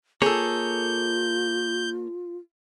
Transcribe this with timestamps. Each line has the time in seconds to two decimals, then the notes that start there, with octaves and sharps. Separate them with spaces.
0.22 A#3 F4 G#4 A4 C#5 G6